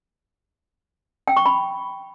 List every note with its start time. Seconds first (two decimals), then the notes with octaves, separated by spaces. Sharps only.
1.28 G5
1.37 C#6
1.46 B5